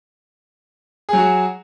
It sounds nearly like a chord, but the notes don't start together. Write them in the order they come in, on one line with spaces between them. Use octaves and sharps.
G#4 F#3 F#4